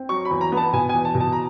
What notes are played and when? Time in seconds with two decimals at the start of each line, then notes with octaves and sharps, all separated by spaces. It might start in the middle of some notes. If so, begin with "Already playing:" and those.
Already playing: C4
0.09 F#3 C#6
0.25 B5
0.31 E2
0.41 A#5
0.52 B3
0.57 A5
0.73 B2 G#5
0.89 G#5
0.94 E2
1.05 A5
1.15 B2
1.20 A5
1.32 A#5